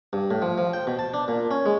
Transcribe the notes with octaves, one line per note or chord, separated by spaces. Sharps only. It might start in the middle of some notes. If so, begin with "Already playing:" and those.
G2
A2
F3
F3
G5
B2
A5
D4
A#2
C#4
G#3